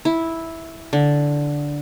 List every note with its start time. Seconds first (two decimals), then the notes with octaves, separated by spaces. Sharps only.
0.05 E4
0.93 D3